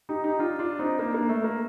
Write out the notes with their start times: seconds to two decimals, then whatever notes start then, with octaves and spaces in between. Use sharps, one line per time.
0.09 D#4 G4
0.24 D#4 G4
0.39 D4 F4
0.59 D4 F4
0.79 C4 D#4
0.99 A#3 D4
1.14 A#3
1.29 A3
1.44 A#3